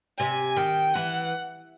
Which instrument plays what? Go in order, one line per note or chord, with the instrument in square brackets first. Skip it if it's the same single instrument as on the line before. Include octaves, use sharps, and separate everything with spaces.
[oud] C3 [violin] G#5
[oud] D#3 [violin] G5
[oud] E3 [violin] F#5